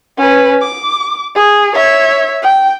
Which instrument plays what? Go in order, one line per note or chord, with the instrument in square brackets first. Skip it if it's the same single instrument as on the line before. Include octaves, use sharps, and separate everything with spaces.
[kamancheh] C#4 B4
D6
G#4
C#5 E5
G5